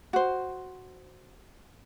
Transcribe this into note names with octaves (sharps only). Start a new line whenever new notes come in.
F#4 C5